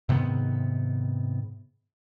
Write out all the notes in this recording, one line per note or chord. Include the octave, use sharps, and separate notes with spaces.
G#2 C3 D#3 B3